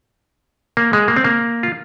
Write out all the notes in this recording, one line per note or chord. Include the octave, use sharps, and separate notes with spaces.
A#3
G#3
A#3
C4
A#3
F4